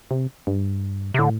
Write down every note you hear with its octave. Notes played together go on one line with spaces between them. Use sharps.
C3
G2
C3
A2 D3